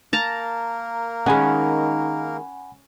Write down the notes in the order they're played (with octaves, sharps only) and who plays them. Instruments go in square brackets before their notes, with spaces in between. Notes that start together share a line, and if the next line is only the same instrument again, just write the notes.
[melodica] A#3 A#4 [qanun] A5 A#5
[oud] D#3 G#3 [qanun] C#4 [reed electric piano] F#5 G#5 B5